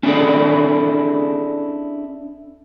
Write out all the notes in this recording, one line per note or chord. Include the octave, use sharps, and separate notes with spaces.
C#4 D4 E4 G#4 A4 D5